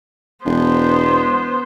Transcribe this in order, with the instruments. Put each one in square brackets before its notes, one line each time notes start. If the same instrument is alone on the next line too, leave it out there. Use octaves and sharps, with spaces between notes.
[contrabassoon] E1 [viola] B3 C5